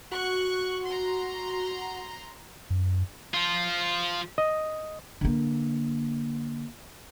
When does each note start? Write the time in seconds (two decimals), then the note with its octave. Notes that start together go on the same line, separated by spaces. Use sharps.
0.11 F#4 C#6 F#6
0.83 A#5 C6
2.70 F#2
3.34 F3 F4
4.38 D#5
5.21 D3 A#3